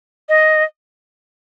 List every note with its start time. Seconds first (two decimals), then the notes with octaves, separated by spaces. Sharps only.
0.29 D#5